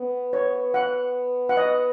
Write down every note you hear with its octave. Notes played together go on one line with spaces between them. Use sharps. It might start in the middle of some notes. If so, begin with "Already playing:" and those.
Already playing: B3
C#5
F#5
F#5
D#5